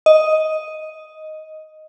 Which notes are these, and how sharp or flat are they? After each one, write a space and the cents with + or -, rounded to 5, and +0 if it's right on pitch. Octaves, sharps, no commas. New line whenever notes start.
D#5 +5